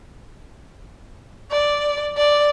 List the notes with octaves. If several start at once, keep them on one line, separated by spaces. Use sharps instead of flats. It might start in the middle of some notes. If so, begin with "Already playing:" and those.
D5
D5